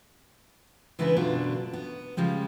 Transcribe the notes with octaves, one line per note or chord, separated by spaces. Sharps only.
C#3 E3 G#3 B3 D4 B4
F#2 B2 D3 D4 F4
B3
C#3 F3 G3 G#3